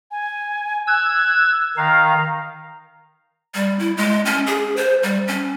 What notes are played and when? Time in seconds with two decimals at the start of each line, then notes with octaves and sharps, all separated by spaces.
0.11 G#5
0.87 E6 F#6 G#6
1.77 D#3 F5 A#5
3.55 G3
3.79 E4
3.97 G#3
4.25 C#4
4.47 G#4
4.77 C5
5.03 G3
5.28 C#4